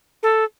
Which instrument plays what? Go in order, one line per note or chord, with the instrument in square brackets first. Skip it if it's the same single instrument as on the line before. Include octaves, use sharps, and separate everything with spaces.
[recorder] A4